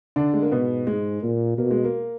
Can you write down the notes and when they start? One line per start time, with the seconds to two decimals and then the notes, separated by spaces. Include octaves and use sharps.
0.16 D3 D4
0.34 G#3
0.42 A#3
0.51 G#2 B2 B3
0.87 G#2 G#3
1.22 A#2 A#3
1.58 B2 A#3
1.71 G#3
1.84 A#3